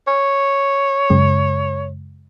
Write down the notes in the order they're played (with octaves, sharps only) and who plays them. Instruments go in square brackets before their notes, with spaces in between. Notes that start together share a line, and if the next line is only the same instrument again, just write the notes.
[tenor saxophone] C#5
[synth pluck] F#2 C#3 G#3